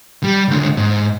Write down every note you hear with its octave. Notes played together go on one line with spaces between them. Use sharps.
G3
C#2 D3
G#2